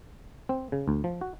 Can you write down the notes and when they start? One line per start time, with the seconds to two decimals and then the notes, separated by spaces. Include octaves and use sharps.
0.49 C4
0.72 C#3
0.88 D2
1.04 F3
1.21 F#4